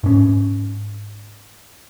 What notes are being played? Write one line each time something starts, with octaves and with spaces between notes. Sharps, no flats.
G#2 C#4